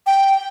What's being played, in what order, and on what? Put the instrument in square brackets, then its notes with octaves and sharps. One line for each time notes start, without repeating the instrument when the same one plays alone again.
[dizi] G5